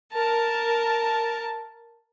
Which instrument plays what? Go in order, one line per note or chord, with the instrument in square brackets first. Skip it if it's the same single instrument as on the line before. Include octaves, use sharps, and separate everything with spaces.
[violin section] A#4 A5